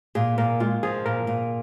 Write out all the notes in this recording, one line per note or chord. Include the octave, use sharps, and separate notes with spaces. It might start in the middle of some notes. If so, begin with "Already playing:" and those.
A#2 G#4
A#2 A#4
G#3 F4
F3 G#4
A#2 A#4
A#2